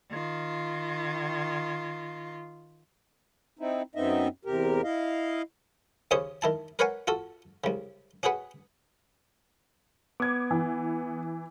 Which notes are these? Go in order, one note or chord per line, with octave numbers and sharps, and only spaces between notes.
D#3 F4
C4 D#4 E4
F#2 B3 C4 D#4 D#5 E5
E2 C3 G4 A#4
E4 D#5 F5
D#2 C#3 C#4 C5 C#5 D#6
D#3 E4 A5
A#4 B4 C#5 F5 F#5 G#5
F4 F#4 A4
C2 C#3
C#4 F#4 G#4 B4 F#5
B3 D6 G#6
E3